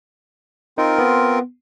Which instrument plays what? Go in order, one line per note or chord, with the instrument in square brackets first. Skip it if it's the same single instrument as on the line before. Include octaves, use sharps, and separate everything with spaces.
[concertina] C4 F4 A#4 [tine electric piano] D#4
[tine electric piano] B3